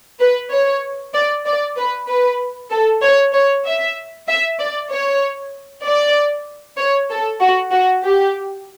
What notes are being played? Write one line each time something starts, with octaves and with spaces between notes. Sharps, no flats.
B4
C#5
D5
D5
B4
B4
A4
C#5
C#5
E5
E5
D5
C#5
D5
C#5
A4
F#4
F#4
G4